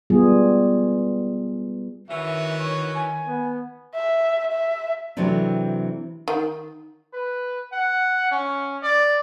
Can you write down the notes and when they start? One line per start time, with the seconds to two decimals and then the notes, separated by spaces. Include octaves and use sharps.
0.10 G3 B3 F4 G#4
2.10 D#3 E3 C#4 F#4 E5
2.59 C#5
2.95 G#5
3.27 B3
3.95 E5
4.52 E5
5.17 C3 E3 F#3 A3 C4 D4
6.28 D#3
7.13 B4
7.72 F#5
8.31 C#4
8.82 D5